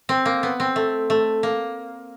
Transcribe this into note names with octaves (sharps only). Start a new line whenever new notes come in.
C4
A#3
B3
C4
A3
A3
A#3